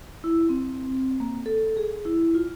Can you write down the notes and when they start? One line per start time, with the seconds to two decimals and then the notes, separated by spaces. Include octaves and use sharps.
0.24 E4
0.49 C4
1.20 A#3
1.46 A4
1.77 G#4
2.05 E4
2.35 F4